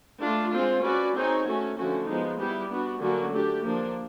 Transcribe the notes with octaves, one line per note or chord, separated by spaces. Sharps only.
A3 D4 F4
G#3 C4 F4
C#4 F#4 B4 D5
C4 D#4 G#4 C#5
A3 C#4 F#4
D3 F3 A3 C#4 F#4
F3 G#3 B3 D#4
G3 B3 E4 G4
B3 D4 F#4
D3 F#3 A#3 C#4 F#4
A3 D4 G4
F3 A#3 D4